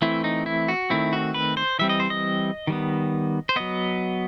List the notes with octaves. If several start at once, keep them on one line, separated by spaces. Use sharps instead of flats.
E3 A3 C4 E4
D#4
E4
F#4
D#3 A3 C4 E4
F#4
B4
C5
E3 G3 C4 E5
D#5
C5
D#5
D#3 G3 B3
C5
F#3 B3 D#5